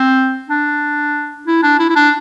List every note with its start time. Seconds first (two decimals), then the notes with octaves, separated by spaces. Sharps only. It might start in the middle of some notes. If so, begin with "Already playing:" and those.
Already playing: C4
0.49 D4
1.47 E4
1.63 D4
1.80 E4
1.90 E4
1.96 D4